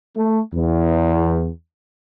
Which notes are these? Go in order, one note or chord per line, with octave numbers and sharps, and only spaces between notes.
A3
E2